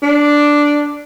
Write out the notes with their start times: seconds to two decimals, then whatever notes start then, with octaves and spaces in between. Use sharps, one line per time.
0.02 D4